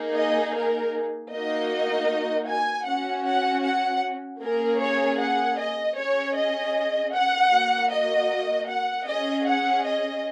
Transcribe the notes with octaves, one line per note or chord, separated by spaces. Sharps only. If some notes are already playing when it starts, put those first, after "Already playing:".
Already playing: A#3 D#4 G#4
D#5
A#4
A#3 D#4 F#4 D#5
G#5
C#4 F#4 F#5
F#5
F#5
A#3 C#4 G#4 A#4
C#5
F#5
D#5
C#4 G#4 C#5
D#5
F#5
A#3 F#4
D#5
F#5
C#4 G#4 D#5
F#5
D#5